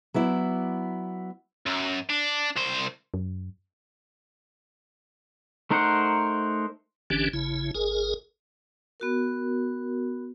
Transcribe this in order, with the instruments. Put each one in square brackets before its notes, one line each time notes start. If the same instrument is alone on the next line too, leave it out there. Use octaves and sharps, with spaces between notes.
[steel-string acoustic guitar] F#3 B3 E4 D5
[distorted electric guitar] F#2
D4
C2 C5
[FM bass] F#2
[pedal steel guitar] A3 D#4 A#4 C5 F#5
[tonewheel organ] G#1 D3 E3 C#4 D4 G4
A1 C#3 E4
G#1 G#4 A#4
[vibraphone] B3 F#4 A#4